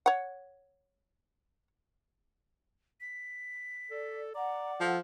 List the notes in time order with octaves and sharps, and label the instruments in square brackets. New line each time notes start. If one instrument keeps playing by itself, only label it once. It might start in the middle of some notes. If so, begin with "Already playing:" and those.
[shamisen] C#5 F#5
[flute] B6
[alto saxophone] A4 [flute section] D5
[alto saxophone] D5 [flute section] F#5 [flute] A#5
[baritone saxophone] F3 [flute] A4